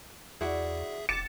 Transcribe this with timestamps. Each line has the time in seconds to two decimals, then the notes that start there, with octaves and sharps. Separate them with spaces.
0.41 E2 E4 F#4 G#4 D5 E5
1.09 E1 D6 A6 C#7 E7